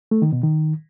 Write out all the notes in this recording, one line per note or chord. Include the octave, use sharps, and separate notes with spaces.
A3
D#3
B2
D#3